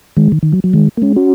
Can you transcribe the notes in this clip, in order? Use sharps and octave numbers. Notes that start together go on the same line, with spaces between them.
D#3 G#3
D#3
D#3
F#3
F#3
D#3 G#3
A#3
G#3 C#4
C#4 F#4